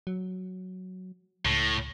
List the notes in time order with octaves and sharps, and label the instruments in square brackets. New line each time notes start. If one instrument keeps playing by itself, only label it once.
[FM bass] F#3
[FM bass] C#2 [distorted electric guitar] A2